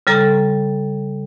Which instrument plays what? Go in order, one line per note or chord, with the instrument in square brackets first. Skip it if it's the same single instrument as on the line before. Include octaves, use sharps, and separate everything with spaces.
[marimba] C#3 G3 A4 A#5